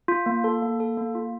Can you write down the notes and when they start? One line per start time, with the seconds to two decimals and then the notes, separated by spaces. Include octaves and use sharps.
0.08 F4
0.26 A#3
0.44 A4
0.62 A#3
0.80 A4
0.97 A#3
1.15 F4